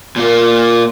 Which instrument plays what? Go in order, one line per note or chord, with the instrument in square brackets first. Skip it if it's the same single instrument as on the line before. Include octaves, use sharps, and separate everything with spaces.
[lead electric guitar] A#2 A#3